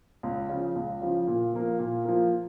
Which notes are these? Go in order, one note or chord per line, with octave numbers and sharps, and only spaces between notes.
C#2
C#3 F3
C#2
C#3 F3
A#2
F3 A#3
A#2
F3 A#3